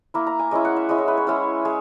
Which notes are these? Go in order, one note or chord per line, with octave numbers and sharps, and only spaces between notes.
A#3 E4 A#5
A#5
G#5
G#3 C#4 E4 D#5
F#5
E5
G#3 C#4 E4 D#5
C#5
B4
C#5
G#3 C#4 E4
G#3